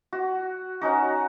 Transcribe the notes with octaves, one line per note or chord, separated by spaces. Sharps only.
F#4
C#4 D#4 F#4